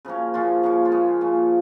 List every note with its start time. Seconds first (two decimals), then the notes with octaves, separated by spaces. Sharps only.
0.05 C#3 F3 A#3 C#4
0.34 A#2 F3 C#4 F4
0.63 C#3 F3 A#3 C#4
0.85 F4
0.92 C#3 G#3 C#4 G#4
1.21 A#2 F3 C#4